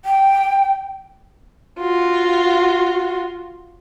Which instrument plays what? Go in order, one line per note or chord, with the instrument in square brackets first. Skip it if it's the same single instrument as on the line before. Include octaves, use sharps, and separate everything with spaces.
[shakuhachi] G5
[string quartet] F4 F#4